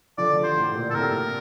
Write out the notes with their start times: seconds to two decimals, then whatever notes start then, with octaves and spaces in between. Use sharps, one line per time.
0.18 D3 F3 D5
0.37 D3 F3
0.43 C5
0.56 A2
0.75 A#2
0.90 A4
0.94 A2 C3 A#4